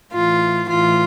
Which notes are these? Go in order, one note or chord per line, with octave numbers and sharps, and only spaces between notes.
A2 E3 F4
A2 E3 F4